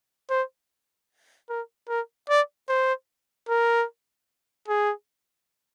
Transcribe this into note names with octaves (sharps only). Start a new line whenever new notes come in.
C5
A#4
A#4
D5
C5
A#4
G#4